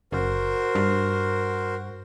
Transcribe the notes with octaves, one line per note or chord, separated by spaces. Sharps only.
F#1 F#4 A#4 C5
G2